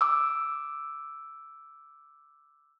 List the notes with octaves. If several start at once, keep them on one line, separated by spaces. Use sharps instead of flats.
D6 E6